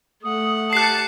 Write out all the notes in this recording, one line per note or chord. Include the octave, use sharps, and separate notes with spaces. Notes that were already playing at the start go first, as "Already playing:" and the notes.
A3 F#5 D#6
G4 A5 F#6 C7 C#7